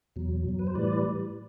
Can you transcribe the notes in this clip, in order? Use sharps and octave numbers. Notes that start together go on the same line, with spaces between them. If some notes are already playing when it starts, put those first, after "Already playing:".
E2 B2 F#3
F#2 F#3
B4
C5
A2 E3 G3 B4 D5